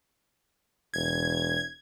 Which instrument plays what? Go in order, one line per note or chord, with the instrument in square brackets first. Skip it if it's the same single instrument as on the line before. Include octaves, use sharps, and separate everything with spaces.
[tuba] E1 [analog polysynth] G#6